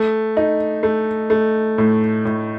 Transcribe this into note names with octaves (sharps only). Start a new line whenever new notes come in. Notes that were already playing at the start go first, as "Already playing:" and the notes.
Already playing: A3
D#4
A3
A3
A2
A2